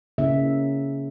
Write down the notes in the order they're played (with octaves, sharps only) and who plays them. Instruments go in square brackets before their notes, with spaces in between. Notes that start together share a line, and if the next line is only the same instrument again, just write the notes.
[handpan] C#3 A#3 E5